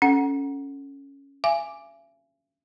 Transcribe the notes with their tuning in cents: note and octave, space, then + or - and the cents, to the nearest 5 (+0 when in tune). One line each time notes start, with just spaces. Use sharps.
C#4 +0 A4 +0 F#5 +0
E5 +45 G#5 +0 D6 +0